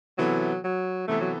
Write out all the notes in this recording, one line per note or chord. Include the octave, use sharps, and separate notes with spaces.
C3 E3 F#3 B3 E4 A4
F#3
C3 E3 A3 B3 E4 A4
F#3